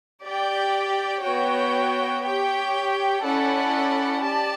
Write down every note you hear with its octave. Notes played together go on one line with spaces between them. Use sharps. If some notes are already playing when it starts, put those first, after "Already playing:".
G4 D5 G5
B3 F#4 C#5 G5
G4 C#5 G5
C#4 E4 A4 D5 F#5
G4 D5 A5